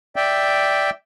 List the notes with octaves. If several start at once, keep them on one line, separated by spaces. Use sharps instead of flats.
D5 E5 G5